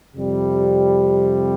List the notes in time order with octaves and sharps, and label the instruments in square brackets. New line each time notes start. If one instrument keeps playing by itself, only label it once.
[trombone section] F2 C3 G3